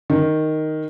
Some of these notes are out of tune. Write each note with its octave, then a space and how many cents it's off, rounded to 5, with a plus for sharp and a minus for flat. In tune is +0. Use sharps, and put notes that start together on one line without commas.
D#3 +0